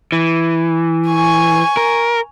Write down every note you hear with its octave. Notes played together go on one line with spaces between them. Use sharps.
E3
G#5 C#6
A#4